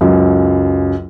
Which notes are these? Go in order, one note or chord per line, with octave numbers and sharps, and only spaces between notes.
C#2 F#2